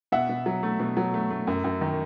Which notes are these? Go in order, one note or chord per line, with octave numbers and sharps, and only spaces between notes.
B2 E5 F#5
B2
F#3
A3
B2
F#3
A3
A3
F#2
F#2
D#3